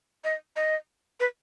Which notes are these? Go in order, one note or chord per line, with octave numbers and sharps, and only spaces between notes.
D#5
D#5
B4